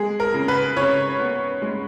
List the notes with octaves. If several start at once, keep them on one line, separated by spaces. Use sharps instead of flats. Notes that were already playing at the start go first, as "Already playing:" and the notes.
Already playing: G#3 G#4
A#4
C#3
B4
C#3 C#5
B3
G#3